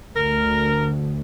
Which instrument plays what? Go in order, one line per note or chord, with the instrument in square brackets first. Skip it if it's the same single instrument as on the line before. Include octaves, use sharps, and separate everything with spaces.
[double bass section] D2 [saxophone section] A#4